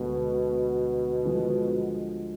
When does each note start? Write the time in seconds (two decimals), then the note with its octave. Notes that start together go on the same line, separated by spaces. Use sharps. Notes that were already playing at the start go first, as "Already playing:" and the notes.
Already playing: D2 B2 D3 G#3
1.25 D3 F3 G#3